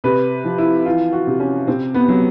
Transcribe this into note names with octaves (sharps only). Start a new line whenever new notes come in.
C3 B4
F3
E4
E3 F4
F#4
C3
C#4
C3 C4
B3
F#3